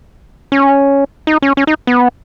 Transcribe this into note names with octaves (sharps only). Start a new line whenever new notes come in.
C#4
D#4
C#4
C#4
D#4
B3